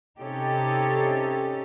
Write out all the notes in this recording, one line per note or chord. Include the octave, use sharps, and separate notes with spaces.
C3 C#4 D#4 G4 A4